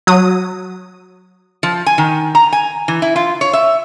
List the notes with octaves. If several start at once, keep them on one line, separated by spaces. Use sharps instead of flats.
F#3 D#6
F3
G#5
D#3
A#5
G#5
E3
E4
F4
C#5
E5